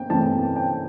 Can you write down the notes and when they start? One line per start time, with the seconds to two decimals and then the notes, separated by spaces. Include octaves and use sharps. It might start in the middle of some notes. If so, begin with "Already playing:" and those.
Already playing: G5
0.10 E3 A3 C4 A5
0.56 G5